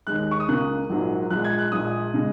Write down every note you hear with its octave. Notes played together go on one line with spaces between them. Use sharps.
D#2 D#3 G#3 F#6
C#6
D#6
C#2 C#3 A#3 F#6
A#1 G#2 F#3 A#3
A#1 A#2 G#3 F#6
G#6
F#6
A#1 A#2 G#3 D#6
C#3 G#3